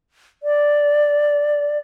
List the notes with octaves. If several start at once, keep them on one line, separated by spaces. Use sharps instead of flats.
D5